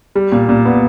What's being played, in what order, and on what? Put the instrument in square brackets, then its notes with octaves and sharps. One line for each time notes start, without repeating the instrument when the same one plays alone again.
[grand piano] G3
A#2
A#2
B3